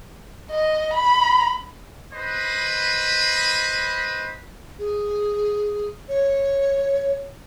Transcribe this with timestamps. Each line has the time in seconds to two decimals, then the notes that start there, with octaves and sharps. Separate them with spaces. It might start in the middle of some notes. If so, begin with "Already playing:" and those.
0.51 D#5
0.93 B5
2.13 B4 C5 D#5 B5
4.79 G#4
6.09 C#5